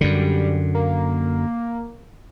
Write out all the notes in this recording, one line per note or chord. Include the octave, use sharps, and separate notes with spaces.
F#2 D3 G3
A#3